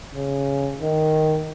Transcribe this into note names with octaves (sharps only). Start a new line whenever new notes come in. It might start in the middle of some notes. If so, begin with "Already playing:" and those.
C#3
D#3